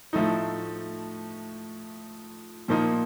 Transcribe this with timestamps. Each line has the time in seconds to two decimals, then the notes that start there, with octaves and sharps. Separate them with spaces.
0.13 A2 F3 A3 D#4
2.68 A#2 F3 A#3 D#4